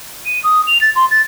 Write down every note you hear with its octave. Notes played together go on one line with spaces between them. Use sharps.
D#7
D#6
F7
A6
C6
A6